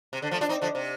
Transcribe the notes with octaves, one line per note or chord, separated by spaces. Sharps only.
C3
D3
F3 A3
D4 F4
C4 D#4
D3 F3
C3